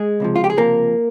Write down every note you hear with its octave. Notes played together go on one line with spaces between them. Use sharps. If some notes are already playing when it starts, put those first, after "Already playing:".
Already playing: G#3 G#4
C#2 C3 F3
F4
G4
G#4
C#2 C3 F3 A#3 A#4